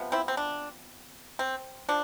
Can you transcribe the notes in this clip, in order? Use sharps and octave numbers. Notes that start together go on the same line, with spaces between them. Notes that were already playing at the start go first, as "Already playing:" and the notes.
Already playing: C3 F3 B3
C4 E4
C4
D4
C4
F3 D4